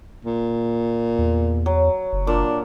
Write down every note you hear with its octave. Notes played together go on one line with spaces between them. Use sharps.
A#2
E2
F#3
F#1
A#2 D4